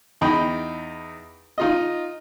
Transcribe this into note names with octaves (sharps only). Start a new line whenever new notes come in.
E2 D#4 G5 B5
D#4 F4 D#5